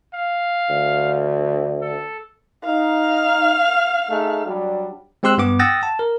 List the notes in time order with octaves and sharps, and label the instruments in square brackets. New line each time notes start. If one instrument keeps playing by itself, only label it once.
[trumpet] F5
[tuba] D2
[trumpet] A4
[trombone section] D#4 [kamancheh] F5 F6
[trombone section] A3 D#4 G#4
F#3 G3 D4
[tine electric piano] G#3 C4 G4 C6 E6 F#6
G2 B3 D6
F#5 G5 D#6 E6 A6 A#6
A5
A#4